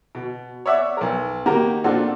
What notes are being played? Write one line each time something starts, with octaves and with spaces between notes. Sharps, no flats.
B2
C#5 D5 E5 F#5
B1 A#4
D#3 A#3 F#4 G4 A#4
A#2 C4 D4 F4 F#4 A4